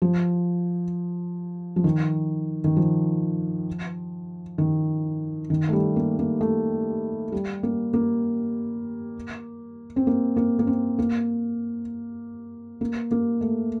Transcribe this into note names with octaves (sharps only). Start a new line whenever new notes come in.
F3
F3
D#3
D#3
F3
D#3
D#3
A3
G3
A#3
A#3
A3
G3
A#3
A#3
C4
A#3
A#3
A#3
C4
A#3
A#3
A#3
A3